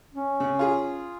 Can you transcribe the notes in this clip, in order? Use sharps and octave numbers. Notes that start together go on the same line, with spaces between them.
C#4
C#3
F4 G#4